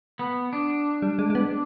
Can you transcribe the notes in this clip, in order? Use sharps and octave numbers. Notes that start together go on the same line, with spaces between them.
B3
D4
G3
G#3
G#3
B3